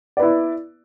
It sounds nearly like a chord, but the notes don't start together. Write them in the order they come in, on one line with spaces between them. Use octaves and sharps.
D5 B4 E4